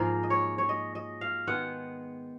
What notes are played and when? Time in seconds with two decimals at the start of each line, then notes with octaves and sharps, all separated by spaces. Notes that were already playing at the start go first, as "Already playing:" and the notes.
Already playing: G#2 F3 A#3 G#4 A#4
0.23 D#5
0.30 C#5
0.58 C#5
0.69 D#5
0.95 D#5
1.21 F5
1.47 D#3 G#3 B3 F#5